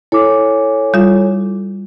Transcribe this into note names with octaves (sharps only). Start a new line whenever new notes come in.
E4 A4 C#5 G#5 D6
G3 F4